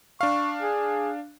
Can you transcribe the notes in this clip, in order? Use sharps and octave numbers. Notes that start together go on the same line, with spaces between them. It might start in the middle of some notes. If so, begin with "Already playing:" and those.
D4 F5 C#6
G#4